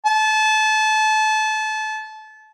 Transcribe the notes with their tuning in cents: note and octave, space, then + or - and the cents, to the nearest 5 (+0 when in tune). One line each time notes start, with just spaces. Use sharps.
A5 -25